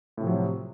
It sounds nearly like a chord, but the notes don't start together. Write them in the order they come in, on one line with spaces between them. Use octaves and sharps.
A2 C3 F3 F#3